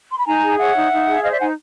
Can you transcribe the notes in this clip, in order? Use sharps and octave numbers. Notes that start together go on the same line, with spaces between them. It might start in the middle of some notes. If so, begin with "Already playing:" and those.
C6
B5
D#4 G#5 A#5
G#4
C#5 E5 F#5
D#4
D#4
G#4
C5 D#5 F5
D5 E5
D#4 F#5 G#5